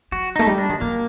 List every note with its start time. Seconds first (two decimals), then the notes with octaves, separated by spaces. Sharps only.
0.12 F#3 F#4
0.36 A3 D#4
0.47 G3
0.58 D4
0.69 D#3
0.81 F#3 A#3